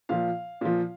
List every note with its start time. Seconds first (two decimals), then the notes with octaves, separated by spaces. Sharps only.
0.09 A#2 F3 F5
0.61 A#2 F3